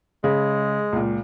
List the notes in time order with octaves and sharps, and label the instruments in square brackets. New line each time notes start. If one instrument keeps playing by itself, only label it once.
[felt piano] C#3 [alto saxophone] G#3
[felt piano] C#2 A#2